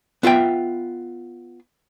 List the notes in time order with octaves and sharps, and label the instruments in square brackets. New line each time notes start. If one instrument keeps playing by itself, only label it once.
[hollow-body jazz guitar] B3 F4 E5 G5